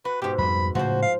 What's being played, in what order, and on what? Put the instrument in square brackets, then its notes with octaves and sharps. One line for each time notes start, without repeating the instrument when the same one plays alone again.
[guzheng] F#4 [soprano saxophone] B4
[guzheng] G#2 B2 [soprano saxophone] G4
[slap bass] F2 G3 [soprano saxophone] B5
[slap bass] A2 C#3 [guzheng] F3 C5 [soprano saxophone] F#4
[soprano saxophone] F5